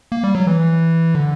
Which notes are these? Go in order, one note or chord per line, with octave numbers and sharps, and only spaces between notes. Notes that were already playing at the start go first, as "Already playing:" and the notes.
A#3
G3
F#3
E3
D3